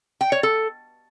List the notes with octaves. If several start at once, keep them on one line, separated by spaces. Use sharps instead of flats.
G5
C#5
A4